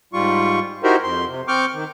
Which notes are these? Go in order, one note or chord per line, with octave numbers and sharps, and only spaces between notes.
G#2 G3 F4 C#6
D#4 E4 F#4 G4 A#4 C5
F2 C6
C3
C4 C#6 D6 F6 G6
D#3